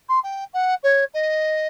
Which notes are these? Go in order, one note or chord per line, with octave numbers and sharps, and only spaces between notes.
C6
G5
F#5
C#5
D#5